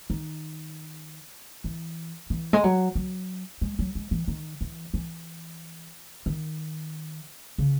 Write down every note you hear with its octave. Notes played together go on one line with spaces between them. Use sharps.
D#3
E3
E3
G#3
F#3
F#3
G#3
F#3
G#3
E3
D#3
E3
E3
D#3
C#3